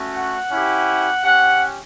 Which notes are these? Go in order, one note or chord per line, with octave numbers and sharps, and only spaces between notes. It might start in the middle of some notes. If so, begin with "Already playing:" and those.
Already playing: A3 C#4 F#4
F#5
C#4 E4 G4
C#4 G4 F#5